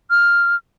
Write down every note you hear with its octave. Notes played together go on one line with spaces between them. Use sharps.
F6